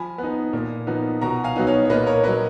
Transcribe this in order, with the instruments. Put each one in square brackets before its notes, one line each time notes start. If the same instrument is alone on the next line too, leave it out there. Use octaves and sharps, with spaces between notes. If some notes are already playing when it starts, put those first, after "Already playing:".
Already playing: [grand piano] F3 G#5 B5
B3
D#4
A#2
F3 B3 D#4
B2 F#5 A#5
F5 G#5
F#3 B3 D#4
C#5 F5
C#5
A#2 B4 D#5
A#4 C#5
F#3 C#4 B4 D#5